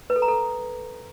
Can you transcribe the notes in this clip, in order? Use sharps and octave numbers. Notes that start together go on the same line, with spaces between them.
B4
A4
A#5
A4